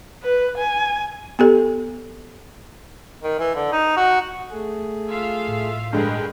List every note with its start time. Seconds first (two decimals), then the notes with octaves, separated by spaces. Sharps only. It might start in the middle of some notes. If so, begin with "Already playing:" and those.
0.23 B4
0.58 G#5
1.39 B3 G4 A4
3.23 D#3
3.39 E3
3.55 D3
3.72 D#4
3.97 F#4
4.51 A3 G#4
5.08 F4 E5 F5
5.48 A2
5.93 G2 D3 G#3 G#4 A#4 B4 G5